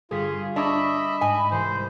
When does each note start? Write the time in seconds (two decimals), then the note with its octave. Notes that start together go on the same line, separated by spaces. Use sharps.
0.11 G1 F4 G#4 B6
0.56 D4 D#5 E5 A#5 B5 C#6 G#6
1.21 G#2 D#5 G#5
1.52 C2 E3 C5